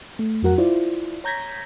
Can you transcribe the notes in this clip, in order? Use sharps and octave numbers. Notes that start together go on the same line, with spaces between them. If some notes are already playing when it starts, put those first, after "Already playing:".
A3
F2 F#3 F#4 A#4 F#5
E4 F4 C5 D5
C#5 A#5 G6 G#6 A#6 B6